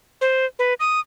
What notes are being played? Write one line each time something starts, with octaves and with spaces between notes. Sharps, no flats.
C5
B4
D#6